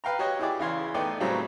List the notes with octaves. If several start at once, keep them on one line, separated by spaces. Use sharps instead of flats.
B4 F5 G5 A#5
F#4 G4 C#5 D#5
E4 G4 G#4 D5
C#3 E3 F5 C6
A3 B3 D#4 D5 G5
A2 C#3 F#3 G3 C4 A#5